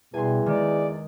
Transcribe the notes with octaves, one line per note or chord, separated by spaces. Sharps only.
E2 B2 G3 G#5 C6
D#3 G#3 D5